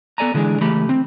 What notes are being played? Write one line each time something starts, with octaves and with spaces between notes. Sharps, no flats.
B3 A4 D5 G#5 A#5
D3 E3 G#3 D4 G#4
C#2 E3 A3 G4 B5
C4